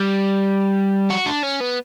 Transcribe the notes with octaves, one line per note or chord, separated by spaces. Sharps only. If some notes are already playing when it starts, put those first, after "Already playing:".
Already playing: G3
F#4
D4
C#4
B3